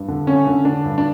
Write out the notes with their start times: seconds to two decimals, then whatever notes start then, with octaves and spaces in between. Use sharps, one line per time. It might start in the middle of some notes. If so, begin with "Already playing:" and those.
Already playing: G2
0.08 D3
0.27 D3 C#4
0.47 D3
0.65 D3 D4
0.85 G2
0.98 D4